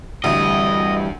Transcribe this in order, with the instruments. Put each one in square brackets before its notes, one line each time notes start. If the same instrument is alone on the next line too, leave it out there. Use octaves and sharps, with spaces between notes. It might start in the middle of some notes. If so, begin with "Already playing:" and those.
[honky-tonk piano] D2 [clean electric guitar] G2 E3 G3 [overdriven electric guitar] D#5